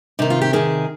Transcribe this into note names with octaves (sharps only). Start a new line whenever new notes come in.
C3 D#3 D#4
F4
G4
C3 D#3 G#4